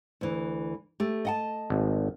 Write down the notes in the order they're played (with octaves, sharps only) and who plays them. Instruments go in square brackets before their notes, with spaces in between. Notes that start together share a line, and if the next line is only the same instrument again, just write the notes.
[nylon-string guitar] D2 E3
A3 G4
D#5 F#5 A5
[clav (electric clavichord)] G#1